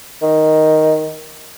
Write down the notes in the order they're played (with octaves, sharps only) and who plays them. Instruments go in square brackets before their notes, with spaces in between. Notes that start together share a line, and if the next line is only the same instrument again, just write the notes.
[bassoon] D#3